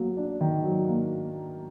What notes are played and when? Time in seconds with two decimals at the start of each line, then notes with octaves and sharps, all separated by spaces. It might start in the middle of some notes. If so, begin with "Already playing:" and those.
Already playing: F#3 A#3
0.17 D4
0.41 D#3
0.64 F#3
0.88 A#3